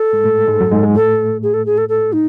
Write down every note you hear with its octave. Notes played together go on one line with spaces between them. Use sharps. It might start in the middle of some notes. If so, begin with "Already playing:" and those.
Already playing: A4
G#2 G#3
A2 A3
G#2 G#3
F#2 F#3
G#2 G#3
G#2 G#3
A2 A3 A4
G#4
A4
G#4
A4
A4
D#4